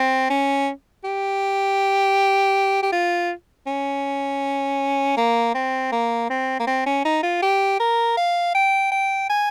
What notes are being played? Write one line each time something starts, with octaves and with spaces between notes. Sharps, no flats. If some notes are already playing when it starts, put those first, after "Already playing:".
Already playing: C4
C#4
G4
G4
F4
C#4
A#3
C4
A#3
C4
A#3
C4
C#4
D#4
F4
G4
A#4
F5
G5
G5
G#5